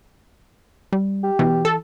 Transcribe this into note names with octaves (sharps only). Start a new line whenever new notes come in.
G3
G4
B2 E3
A4